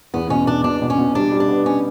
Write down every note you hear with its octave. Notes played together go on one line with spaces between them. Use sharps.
E2 B3
B2 C#4
B2 D4
B2 D4
B2
C#4
B2
G3 D4
G3
D4
B3
C#4